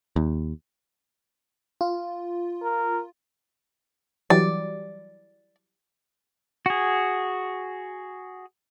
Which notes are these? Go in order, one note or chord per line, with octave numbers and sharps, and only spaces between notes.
D#2
F4
A#4
E3 F#3 G3 D5
F#4 G#4